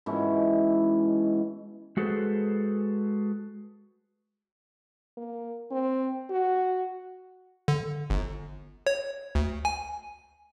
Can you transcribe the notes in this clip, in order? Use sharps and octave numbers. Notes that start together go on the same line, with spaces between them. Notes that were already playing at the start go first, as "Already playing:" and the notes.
G#2 B2 E3 C#4
G#3 F#4 G#4 A4 B4 C5
A#3
C4
F#4
D3
G1
C#5
D2
G#5